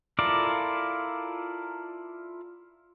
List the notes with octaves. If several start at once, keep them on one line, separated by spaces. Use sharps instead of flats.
E4 F4 A4 A#4 D5